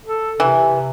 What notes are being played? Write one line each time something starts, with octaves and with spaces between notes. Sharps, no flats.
A4
C3 E3